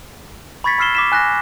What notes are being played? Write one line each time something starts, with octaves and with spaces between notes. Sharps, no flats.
B5 C#6 G#6 A6 B6 C#7
B5 E6 F6 C7 E7 G7
D6 B6 E7
G#5 F#6 A6 A#6